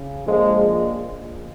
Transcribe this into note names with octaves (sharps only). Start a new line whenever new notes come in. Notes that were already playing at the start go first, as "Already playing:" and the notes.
Already playing: C#3
A#1 A#2 F3 G#3